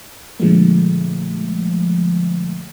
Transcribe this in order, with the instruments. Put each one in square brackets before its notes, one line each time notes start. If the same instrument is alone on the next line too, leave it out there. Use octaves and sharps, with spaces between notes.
[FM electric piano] A#2 D3 F3 G#3 A3